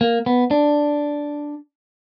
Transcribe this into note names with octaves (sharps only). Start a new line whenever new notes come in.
A#3
B3
D4